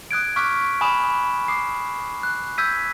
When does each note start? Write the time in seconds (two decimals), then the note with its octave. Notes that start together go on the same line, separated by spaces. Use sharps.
0.11 D#6 F#6 G#6 D7
0.36 C#6 D6 F6 F#6 B6
0.81 G#5 B5 D#6 E7
1.48 D6 D#6 C7
2.23 F#6
2.58 E6 G6 G#6 B6 D#7